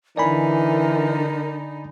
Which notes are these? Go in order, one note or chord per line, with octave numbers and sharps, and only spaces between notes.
D3 E3 D#4 A#4 D5 G#5 B5